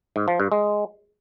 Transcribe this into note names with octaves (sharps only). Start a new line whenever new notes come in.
G#2
F3
G2
G#3